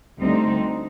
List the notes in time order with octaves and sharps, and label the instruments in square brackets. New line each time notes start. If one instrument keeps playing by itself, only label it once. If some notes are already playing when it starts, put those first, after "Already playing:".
[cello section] D2 D3 G3 C4 D#4